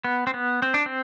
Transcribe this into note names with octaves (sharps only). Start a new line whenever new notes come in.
B3
C4
B3
C4
D4
C4